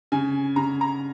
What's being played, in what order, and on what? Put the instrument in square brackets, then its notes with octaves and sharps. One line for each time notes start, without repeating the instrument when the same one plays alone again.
[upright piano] C#3 G#5
C#3 A#5
A#5